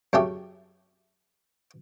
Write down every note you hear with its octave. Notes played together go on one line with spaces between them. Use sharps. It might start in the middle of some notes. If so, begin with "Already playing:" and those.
F#2 C#3 A3 G4 E5